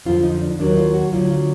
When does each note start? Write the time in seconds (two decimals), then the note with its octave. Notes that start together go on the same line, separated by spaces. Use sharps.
0.05 F2 D3 F3 F4
0.24 D#4
0.41 D4
0.59 D#2 D#3 F#3 D4
0.71 D#4
0.77 F4
0.94 F#4
1.12 D2 D3 F#3 F4
1.30 F4